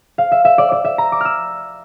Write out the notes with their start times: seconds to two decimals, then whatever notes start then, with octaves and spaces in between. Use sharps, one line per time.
0.18 F5
0.32 E5
0.45 E5
0.58 D5
0.72 D5
0.85 E5
0.98 A#5
1.12 D6
1.21 E6 F6